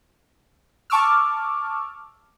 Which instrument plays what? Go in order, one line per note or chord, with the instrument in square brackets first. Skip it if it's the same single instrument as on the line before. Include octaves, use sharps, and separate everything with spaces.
[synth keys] A5 C#6 D6 E6 F6